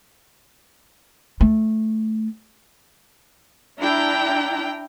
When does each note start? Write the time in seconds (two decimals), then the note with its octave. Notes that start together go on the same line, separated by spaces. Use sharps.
1.41 A3
3.78 D4 E4 G5 A#5